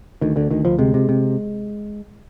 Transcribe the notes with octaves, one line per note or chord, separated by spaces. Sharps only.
D2 D#3
D2 D3
D2 D#3
D2 F3
C3 G#3
C3
C3